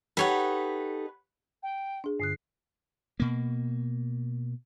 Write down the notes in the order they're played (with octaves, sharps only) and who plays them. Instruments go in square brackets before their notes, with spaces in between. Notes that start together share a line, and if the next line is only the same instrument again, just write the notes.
[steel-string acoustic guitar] D#4 G4 A4 [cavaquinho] B4 C#5 F#5
[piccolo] G5
[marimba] D4 G#4
[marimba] G2 D3 F#6 [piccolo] C7
[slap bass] B2 A#3